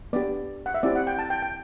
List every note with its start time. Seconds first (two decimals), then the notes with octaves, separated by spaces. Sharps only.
0.13 B3 D4 G4 D5
0.66 F#5
0.74 E5
0.83 C4 E4 G4 D5
0.95 F#5
1.07 G5
1.19 A5
1.30 G5
1.42 G5